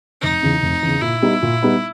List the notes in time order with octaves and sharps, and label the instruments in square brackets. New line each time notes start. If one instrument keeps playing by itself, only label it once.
[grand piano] F1 [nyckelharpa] D#4
[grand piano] E2 C#3
F1
E2 C#3
[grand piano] A#2 [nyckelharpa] E4
[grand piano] G3 B3 D#4
A#2
G3 B3 D#4